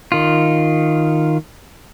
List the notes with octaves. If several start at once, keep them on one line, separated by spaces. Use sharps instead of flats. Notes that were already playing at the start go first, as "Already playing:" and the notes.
D#3 F4